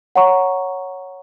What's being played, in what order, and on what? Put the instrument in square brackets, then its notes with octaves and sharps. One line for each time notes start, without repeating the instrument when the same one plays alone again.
[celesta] C#5 F#5 A#5 C#6